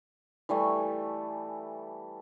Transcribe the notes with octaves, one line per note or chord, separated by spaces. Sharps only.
E3 G3 A3 G#5